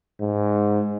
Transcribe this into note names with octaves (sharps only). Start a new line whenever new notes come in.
G#2